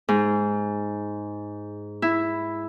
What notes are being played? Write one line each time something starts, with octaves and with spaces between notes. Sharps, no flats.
G#2
E4